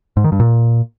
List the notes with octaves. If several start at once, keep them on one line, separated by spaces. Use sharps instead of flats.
G#2
D#3
G2
A#2